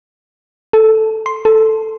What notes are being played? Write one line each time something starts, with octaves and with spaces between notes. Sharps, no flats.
A4
C6
A4